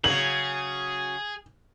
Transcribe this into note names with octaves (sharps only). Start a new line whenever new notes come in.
C#3 F#3 G#4 F#7